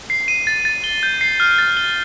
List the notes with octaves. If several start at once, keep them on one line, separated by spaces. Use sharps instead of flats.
C7
D#7
A6
A6
G7
G6
C7
F6
A6
G7